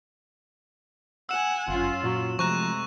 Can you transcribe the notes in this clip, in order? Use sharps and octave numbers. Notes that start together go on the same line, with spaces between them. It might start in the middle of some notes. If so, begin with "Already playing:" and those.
F#5 G#5 E6 E7
G1 F#2 C#4 F4
A#2 F#3
C3 F3 G#3 A3 A#5 C#6 F#6 E7